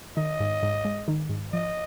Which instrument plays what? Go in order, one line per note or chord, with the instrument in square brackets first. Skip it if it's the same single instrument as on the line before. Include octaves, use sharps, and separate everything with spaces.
[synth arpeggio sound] D#3 [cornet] D#5
[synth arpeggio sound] G#2
G#2
G#3
D#3
G#2
[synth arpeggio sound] F3 [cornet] D#5